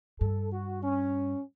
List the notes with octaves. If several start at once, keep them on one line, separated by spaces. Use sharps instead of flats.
G2 A4
F#4
C#4